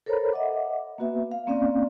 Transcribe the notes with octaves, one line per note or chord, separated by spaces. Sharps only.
A4 A#4 C5 C#5 A#5 B5
D#5 E5 F#5 D6
A#3 B3 F#4 B4 E5
F5
A#3 C4 C#4 D5 F5